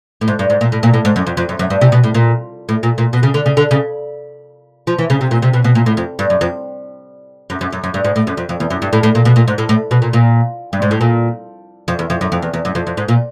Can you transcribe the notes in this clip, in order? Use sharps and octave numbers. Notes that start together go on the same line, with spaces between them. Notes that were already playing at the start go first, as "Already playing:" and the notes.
A2
G#2
G2
G#2
A#2
A2
A#2
A2
G#2
F#2
F2
F2
F#2
F#2
G2
C3
B2
A2
A#2
A2
A#2
A#2
B2
C#3
D3
C#3
D3
C#3
F3
E3
C#3
C3
A#2
C3
B2
B2
A#2
A2
F2
G2
F#2
F2
F#2
F#2
F#2
F#2
G2
G#2
A2
F#2
F2
F2
E2
F#2
G2
A2
A2
A#2
B2
A#2
G#2
A2
A2
B2
A#2
A#2
G2
G#2
A2
A#2
F2
E2
F2
F#2
F2
E2
E2
F#2
F2
F2
G#2
A#2